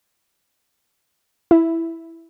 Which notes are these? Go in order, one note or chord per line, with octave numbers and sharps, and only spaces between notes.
E4